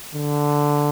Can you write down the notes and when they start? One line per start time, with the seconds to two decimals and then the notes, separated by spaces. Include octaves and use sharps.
0.14 D3